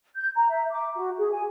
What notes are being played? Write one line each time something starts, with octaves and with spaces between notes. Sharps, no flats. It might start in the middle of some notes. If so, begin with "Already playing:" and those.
G6
A#5
E5
D6
F#4
G#4
G#5